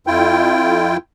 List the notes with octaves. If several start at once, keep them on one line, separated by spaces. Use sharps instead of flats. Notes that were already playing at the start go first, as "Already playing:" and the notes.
F2 E4 F4 G5